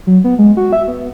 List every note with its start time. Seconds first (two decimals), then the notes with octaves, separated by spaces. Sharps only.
0.07 F#3
0.24 B3
0.39 G#3
0.57 F#4
0.73 E5
0.88 B3